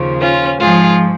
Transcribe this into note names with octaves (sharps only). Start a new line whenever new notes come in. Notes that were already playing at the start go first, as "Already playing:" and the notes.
Already playing: D#2 C#3 F3
C#4 F4
G#2 F3 F4 G#4